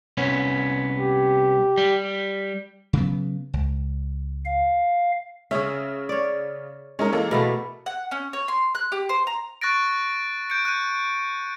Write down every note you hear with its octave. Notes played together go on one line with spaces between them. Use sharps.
C2 B3 C#4
G4
G3
C#3 F#3 B3
C#2
F5
C#3 C#4 G#4 E5
C#5 D5
G#3 C#4 D#4 A#4
E3 A#3 A4
B2 A3 B3
F#5
C#4
C#5
C6
F#6
G4
C5
A#5
C#6 F#6 A6 A#6 D7
G6 C#7 D7
F#6 G6 D#7